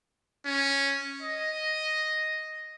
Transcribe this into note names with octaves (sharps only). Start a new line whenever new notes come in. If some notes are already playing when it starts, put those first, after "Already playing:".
C#4
D#5